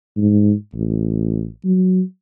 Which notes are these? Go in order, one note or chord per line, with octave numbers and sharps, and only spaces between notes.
G#2
A1
F#3